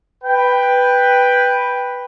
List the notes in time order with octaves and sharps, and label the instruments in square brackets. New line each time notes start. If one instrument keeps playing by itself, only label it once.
[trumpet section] B4 G5